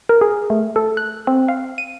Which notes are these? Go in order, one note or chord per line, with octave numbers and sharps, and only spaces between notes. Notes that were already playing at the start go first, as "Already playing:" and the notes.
A#4
G#4
A3
A4
F#6
C4
F5
D#7